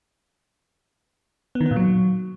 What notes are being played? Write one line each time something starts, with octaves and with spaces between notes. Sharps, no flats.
B3
D#3
B3
A#2
F#3